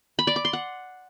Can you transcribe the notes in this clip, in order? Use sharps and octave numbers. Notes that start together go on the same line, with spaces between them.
B5
D5
D6
C6
F#5